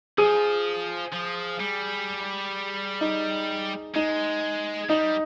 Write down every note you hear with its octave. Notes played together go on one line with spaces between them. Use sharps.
F3 G#4
F3
G3
D#4
G#3 D#4
G3 D#4